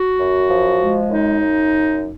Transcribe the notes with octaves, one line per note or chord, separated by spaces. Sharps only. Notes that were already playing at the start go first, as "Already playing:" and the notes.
Already playing: F#4
F#2
F3
G#3
F#2 D#4
F#2